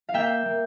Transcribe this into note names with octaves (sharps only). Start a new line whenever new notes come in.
F5
A#3 E5 G5
A#3